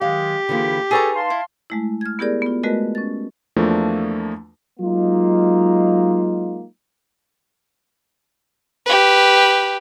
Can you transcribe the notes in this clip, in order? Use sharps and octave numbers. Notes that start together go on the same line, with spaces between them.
D#3 F#3 G#3 G4 F5
D3 E3 A#3 F4 G#4 B5
D#4 G#4 A4 B4 C#5 A#5
F5 A5 C6
E4
G#3 A3 E4
F6 G#6
B3 E4 G4 G#4 A#4 D5
B3 F4
G#3 A3 F#4 A#4 B4 D#5
C#4 A6
E2 F3 A3 A#3 D4
F#3 G#3 A#3 D#4 F4
G4 B4